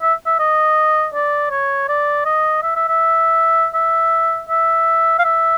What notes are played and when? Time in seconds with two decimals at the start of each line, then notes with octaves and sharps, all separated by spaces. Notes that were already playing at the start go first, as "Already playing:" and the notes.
0.02 E5
0.26 E5
0.39 D#5
1.14 D5
1.50 C#5
1.89 D5
2.25 D#5
2.63 E5
2.76 E5
2.88 E5
3.74 E5
4.49 E5
5.19 F5
5.24 E5